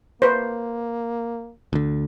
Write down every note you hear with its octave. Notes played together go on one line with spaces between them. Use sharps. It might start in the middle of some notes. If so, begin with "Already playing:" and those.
A#3 B4 C5
D2 D3